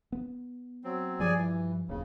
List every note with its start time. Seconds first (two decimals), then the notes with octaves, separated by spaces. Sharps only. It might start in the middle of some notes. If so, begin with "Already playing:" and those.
0.12 B3
0.84 F#3 C4
1.20 G2 F3 G#4 D5 G#5
1.36 E3
1.89 D1 D#2 C#3